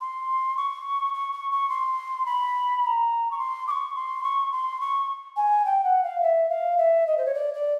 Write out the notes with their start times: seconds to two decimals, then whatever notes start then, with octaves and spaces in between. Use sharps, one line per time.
0.01 C6
0.57 C#6
1.14 C#6
1.32 C#6
1.51 C#6
1.70 C6
2.26 B5
2.83 B5
2.87 A#5
3.31 C#6
3.39 C6
3.67 D6
3.71 C#6
3.96 C6
4.23 C#6
4.52 C6
4.81 C#6
5.37 G#5
5.65 G5
5.84 F#5
6.03 F5
6.22 E5
6.49 F5
6.78 E5
7.07 D#5
7.18 C5
7.26 C#5
7.34 D5
7.54 D5